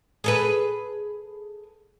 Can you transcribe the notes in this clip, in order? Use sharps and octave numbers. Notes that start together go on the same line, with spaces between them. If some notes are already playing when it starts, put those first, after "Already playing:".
G#4 A4 B4